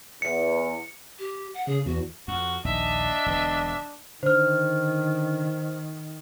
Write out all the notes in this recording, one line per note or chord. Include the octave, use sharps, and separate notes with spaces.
E2 C#7
G4
F#5
C#3 G#4
E2 F#4
F2 F#4
A#1 D#2 D4 D#5 E5
E1 D3
D3 D#3 C5 F6